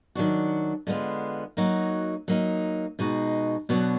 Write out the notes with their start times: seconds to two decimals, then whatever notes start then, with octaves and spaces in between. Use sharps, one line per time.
0.15 D#3 F#3 D4 F#4
0.87 D3 G#3 B3 F4
1.57 F#3 A#3 D#4 F#4
2.28 F#3 A#3 D#4
2.99 B2 G#3 D#4 F#4
3.69 B2 F#3 B3 D4 F#4